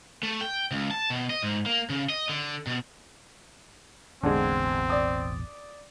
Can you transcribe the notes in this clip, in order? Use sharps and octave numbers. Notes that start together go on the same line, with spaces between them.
A3
G5
C#2
A5
B2
D#5
G#2
A#3
C#3
D#5
D3
B2
E1 A1 D3 G#3 B3 C4
D5 D#6